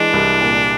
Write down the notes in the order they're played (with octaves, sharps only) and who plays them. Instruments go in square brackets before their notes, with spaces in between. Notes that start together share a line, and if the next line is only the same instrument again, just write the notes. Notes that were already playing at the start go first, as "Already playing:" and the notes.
Already playing: [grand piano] E3 G#3 [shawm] D4
[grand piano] C2
A#2